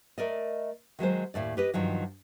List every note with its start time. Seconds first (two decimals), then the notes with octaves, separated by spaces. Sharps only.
0.18 A3 A#4 D5 D#5
0.99 D#3 F#3 G#3 C5
1.34 D#2 A2 F#3 D5
1.57 G4 B4 D#5
1.74 G2 D#3 F3 F#3